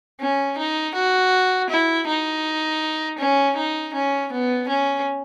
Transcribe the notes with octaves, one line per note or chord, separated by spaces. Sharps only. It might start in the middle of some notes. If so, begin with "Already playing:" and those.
C#4
D#4
F#4
E4
D#4
C#4
D#4
C#4
B3
C#4